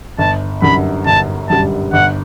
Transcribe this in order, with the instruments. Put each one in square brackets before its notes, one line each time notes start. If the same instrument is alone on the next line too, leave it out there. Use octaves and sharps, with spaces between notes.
[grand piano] G1 [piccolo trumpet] A5
[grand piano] F#2 D3 G3 [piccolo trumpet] B5
[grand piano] G1 [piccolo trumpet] A5
[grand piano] F#2 D3 G3 [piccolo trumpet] A5
[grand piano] G1 [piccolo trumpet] F#5